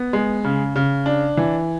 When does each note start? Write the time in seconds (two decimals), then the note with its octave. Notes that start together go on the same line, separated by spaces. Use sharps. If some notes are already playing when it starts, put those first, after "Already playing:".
Already playing: B3
0.13 G#3
0.44 C#3
0.76 C#3
1.06 D4
1.37 E3